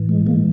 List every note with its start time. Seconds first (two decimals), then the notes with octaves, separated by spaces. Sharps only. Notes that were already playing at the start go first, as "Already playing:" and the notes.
Already playing: A2 E3
0.09 G#3
0.26 G#3 A#3